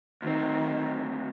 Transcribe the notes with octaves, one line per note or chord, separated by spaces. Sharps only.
D2 D#3 C4